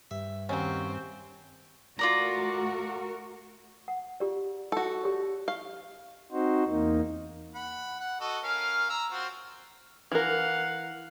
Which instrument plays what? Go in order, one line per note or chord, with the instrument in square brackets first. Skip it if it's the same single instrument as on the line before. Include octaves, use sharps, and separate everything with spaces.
[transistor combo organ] G2 [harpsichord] E5
[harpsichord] D#2 [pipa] F#3 C#4 [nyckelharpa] C4
[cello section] A3 F#4 A#4 [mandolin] F4 D5 A#5
[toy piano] F#5
F4 G4 D5
[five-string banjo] F#4 A4
[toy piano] G4 C#5 D5
[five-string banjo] F5 [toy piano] C#6
[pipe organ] C4 D#4 F#4 C5
E2 A#3 D#4
[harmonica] F#5 B5
F#5
F#4 A4 D#5
C#4 A#4 F5
A#5 E6
C4 F4 F#4
[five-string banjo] E3 A#4 [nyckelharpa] F5 F#5